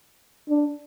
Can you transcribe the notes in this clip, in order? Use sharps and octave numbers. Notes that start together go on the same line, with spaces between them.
D4